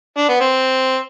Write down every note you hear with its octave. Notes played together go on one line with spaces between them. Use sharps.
D4
B3
C4